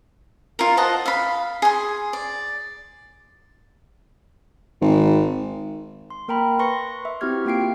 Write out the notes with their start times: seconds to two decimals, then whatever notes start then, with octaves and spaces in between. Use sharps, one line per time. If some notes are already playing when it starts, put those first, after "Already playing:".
0.59 F4 A#4
0.77 C5 D#5 F#5 A5
1.06 F5 B5
1.62 G#4 C6
2.13 D5
4.81 G#1
6.10 C6
6.28 A#3 A#4 G5 A#5 B5
6.59 B4 C6 C#6 A#6 C#7
7.05 E5
7.21 C4 E4 F#4 G4 F6 G#6
7.45 A#3 F4 G5 C7 D7